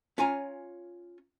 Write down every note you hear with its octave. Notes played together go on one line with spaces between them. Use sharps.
C#4 F4 C#5 G#5 A#5